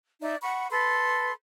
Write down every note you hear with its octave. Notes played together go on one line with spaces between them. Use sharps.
D#4 D5 E5
F#5 B5 C#6
A4 B4 B5 C6